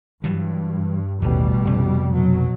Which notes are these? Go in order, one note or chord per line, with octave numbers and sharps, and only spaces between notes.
G2 E3 F#3 G3
A1 D#2 B2 G3
F2 C3
B2 F#3